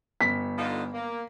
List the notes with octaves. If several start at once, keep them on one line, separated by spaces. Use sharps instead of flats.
G1 B6
D3 D#4 F4
A#3